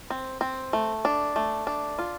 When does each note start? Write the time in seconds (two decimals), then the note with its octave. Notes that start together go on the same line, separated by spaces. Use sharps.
0.10 C4
0.41 C4
0.73 A3
1.05 D4
1.36 A3
1.67 D4
1.99 F4